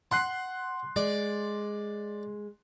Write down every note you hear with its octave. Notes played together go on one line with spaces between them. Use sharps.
F#5 C6 F#6 C7
G#3 D5